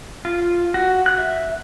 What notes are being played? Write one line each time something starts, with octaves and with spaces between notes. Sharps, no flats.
F4
F#4
F#6
E5